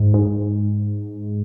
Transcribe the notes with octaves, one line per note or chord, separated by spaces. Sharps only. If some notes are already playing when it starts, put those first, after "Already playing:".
Already playing: G#2
G#2